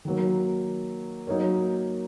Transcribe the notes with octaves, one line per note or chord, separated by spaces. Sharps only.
D#3 F#3 A#3
F#3 A#3 D#4 A#4 C#5